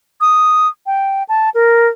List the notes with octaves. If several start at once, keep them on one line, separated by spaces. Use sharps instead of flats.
D#6
G5
A5
A#4